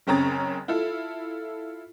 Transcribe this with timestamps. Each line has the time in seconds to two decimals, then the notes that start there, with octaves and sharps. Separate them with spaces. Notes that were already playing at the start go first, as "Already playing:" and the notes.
0.07 F#1 C#3 C4 C#4 A#5 A6
0.68 E4 F4 A4